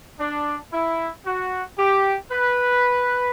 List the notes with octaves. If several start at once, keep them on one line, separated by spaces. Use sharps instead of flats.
D4
E4
F#4
G4
B4